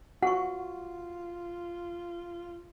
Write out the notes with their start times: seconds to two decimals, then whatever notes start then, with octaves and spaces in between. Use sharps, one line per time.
0.23 F4 F#4 F#5 C#6